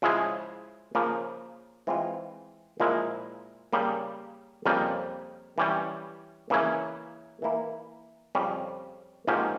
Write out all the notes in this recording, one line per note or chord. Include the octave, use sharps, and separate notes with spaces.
C#3 F3 G#3 E4 G#4
C#3 F3 A#3 F4
E3 G#3 C4 F4
A#2 F3 G#3 E4 A#4
C#3 G3 A#3
F2 C#3 G3 A#3
E3 G3 C#4
C#3 E3 A#3 C#4 E4
E3 A#3 E4
F2 C#3 G3 C#4 G4
G#2 F3 A#3 C#4 G4